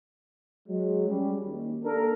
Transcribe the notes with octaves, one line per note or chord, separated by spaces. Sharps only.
F#3 G#3
G3 C#4
D#2
A#3 D4 A4 A#4